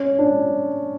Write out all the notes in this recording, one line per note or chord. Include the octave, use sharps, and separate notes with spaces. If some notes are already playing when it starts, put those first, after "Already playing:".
Already playing: C#4
D4